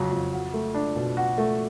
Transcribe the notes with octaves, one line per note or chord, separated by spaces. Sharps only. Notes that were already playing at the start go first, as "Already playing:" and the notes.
Already playing: F2 C#3 F#3
F2
F#4
A3
D4
B2
F#4
A3